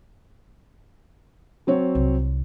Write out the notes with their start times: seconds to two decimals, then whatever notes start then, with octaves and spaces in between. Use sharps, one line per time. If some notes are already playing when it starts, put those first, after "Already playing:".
1.67 F#3 C4 C#5
1.95 C2